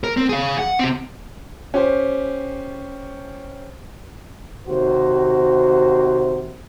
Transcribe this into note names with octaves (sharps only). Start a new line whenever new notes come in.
A#4
C4
G#4 F5
F#5
C4 G4
C#4 G4 C5
D#2 C3 F#4 C5